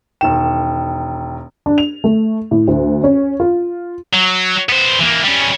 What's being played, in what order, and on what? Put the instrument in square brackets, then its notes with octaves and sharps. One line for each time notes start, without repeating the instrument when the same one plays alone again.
[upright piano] E1 D#3 E7 [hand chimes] G5
[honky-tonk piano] D4
F7
A3
A2
D2
C#4
F4
[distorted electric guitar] F#3
B3 C5
E3 A#3
G3 C#4